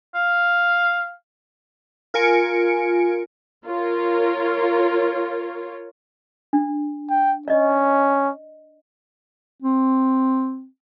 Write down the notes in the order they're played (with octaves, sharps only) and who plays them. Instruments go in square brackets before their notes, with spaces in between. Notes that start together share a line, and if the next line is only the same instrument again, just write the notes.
[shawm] F5
[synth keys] F4 A#4 G#5 C#7 D7
[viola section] F4 A#4 C#5
[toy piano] D4
[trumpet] G5
[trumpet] C#4 [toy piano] D5 D#5
[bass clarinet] C4